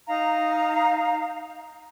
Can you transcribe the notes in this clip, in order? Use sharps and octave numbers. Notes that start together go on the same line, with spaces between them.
D#4 F5 A#5